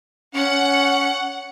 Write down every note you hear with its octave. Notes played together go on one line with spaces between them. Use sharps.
C#4 F#5